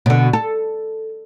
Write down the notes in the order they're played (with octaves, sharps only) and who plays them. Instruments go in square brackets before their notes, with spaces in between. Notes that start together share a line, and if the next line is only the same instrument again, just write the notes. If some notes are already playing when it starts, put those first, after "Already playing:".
[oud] B2 D3
A4